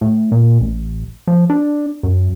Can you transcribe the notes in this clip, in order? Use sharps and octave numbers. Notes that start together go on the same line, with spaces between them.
A2
A#2
A1
F3
D4
F#2